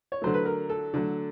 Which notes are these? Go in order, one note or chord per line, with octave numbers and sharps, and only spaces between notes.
C#5
D3 F#3 A3 C5
B4
A#4
A4
D3 F#3 A3